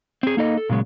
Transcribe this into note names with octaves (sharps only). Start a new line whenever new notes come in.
C4 G#4
A#3 D#4 A4 D#5
A4
A#2 C#3 F#3 G#3